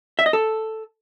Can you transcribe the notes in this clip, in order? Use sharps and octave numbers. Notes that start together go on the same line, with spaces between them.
E5
D#5
A4